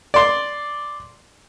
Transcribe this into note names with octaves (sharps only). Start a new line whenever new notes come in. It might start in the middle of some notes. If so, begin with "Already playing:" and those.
D5 C6